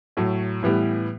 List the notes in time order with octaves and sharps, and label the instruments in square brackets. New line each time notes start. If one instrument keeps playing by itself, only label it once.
[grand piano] A2 F#3 A3
A2 E3 G3 B3